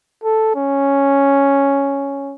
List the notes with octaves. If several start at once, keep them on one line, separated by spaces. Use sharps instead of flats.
A4
C#4